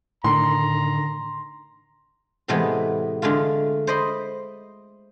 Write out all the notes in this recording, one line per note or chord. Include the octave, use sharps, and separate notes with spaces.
A2 D3 D#3 A#5 C6
A2 C3 E3 G#3 A3 B3
D3 G#3 A3 F4
C5 D5 D#5 B5 C6